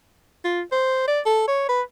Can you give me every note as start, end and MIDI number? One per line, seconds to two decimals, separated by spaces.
0.44 0.62 65
0.72 1.03 72
1.08 1.20 74
1.26 1.44 69
1.48 1.68 73
1.69 1.82 71